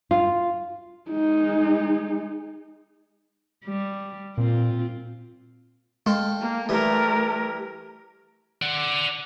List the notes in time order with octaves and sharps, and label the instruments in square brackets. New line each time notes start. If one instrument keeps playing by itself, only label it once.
[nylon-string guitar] F4
[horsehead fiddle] G#3 D#4
[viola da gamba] G3
[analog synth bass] A#2 [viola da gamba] C4 F4
[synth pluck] G#3 [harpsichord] A4 F5 G5
[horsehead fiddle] A#3
[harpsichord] E3 G3 [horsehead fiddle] A3 A#4
[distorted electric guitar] D5 F#5